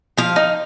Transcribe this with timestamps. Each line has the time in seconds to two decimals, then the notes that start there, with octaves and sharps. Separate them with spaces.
0.18 F3 F5
0.36 D#4